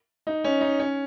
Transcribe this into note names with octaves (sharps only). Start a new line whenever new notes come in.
D#4
C#4
D#4
C#4